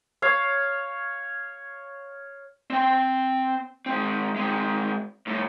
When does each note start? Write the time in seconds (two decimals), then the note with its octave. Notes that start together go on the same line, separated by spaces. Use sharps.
0.22 C#5 F5
2.70 C4 G5
3.86 G#3 C4
4.36 G#3 C4
5.27 C2 A2